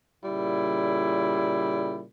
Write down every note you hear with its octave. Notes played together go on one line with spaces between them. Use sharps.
A#2 C#3 G3 E4